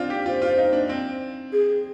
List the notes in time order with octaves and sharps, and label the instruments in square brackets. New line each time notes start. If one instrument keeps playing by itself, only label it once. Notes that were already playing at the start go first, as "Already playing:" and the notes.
Already playing: [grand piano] C4 D4 F4
G4
[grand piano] F4 [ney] C5
[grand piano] F4
D#4
D4
C4
[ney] G#4